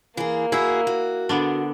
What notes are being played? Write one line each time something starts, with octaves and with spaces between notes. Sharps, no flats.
E3 A#3 G#4
E4 F#4 G#4
F#4
D3 B3 D4